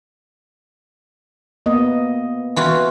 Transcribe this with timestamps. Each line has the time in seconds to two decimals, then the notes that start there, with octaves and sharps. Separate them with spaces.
1.66 A#3 B3 D#5
2.56 E3 F4 F#4